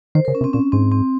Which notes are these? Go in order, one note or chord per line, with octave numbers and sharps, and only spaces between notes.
D#3 C5
C#3 A#4
C#4
C3
C4
A#2 C#4
G#2 C4
C4